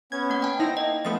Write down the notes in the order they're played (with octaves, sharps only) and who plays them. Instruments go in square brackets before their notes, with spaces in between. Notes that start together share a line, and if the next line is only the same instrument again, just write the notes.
[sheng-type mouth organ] B3 C#4 [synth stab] G#6
[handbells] A#3 F#5
G5 A5
[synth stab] D#4 E4 A#6 [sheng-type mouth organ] C5
[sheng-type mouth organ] A#3 [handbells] D#5
[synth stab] F3 A3 B3 [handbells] D#6 A6